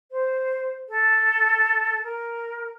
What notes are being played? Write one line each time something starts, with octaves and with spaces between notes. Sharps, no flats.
C5
A4
A#4